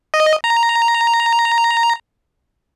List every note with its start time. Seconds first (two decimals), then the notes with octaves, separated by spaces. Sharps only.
0.14 D#5
0.44 A#5